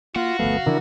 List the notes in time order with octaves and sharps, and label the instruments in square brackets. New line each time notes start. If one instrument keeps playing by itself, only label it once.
[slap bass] A#3 [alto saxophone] F4 [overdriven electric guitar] F#4
[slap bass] G1 D2 F3 [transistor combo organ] A3 B3 [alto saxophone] F5
[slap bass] C#3 E3 F3 [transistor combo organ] D4 E4 A#4